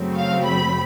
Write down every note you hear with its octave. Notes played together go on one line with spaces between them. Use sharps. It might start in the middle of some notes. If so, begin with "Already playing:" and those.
Already playing: F#2 C#3 F#3 A3 C4
F5
B5